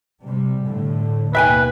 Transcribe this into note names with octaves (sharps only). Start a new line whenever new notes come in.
C3 G3
A2 D3
D#2 B2 B4 E5 G5 G#5